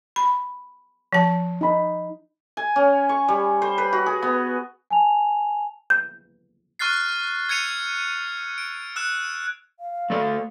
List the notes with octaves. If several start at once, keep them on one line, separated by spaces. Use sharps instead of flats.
B5
F3 A5
D#4 B5
G#5
C#4
C#6
G3
C5
B4
F#4
G#4
B3
G#5 A5 F7
G6
C#6 F6 F#6 A6 C7
E6 G#6 C7 C#7 D#7 F7
D7
E6 F#6 E7
F5
A3 A4 D5